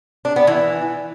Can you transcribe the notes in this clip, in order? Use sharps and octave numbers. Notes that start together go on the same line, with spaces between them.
D4
B3
E3